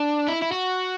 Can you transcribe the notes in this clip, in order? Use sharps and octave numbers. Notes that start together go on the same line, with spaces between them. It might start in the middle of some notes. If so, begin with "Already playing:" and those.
Already playing: D4
E4
E4
F#4